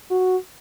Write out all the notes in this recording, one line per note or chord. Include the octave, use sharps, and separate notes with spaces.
F#4